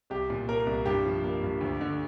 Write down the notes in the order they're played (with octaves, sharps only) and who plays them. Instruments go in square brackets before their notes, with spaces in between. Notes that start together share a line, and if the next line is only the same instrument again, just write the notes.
[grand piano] C2 G4
A#2
A#3 A#4
C2
G2 G4
F3
A#3
G2
D2
D3